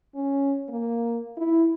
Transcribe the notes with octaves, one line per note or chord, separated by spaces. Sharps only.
C#4
A#3
E4